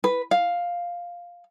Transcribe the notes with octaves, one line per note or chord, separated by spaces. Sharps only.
B4
F5